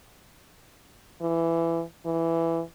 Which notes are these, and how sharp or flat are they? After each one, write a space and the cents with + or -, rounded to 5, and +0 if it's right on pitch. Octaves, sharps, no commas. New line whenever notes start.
E3 +15
E3 +10